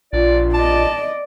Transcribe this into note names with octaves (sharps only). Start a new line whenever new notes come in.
A#1 F4 D5
D5 D#5 A5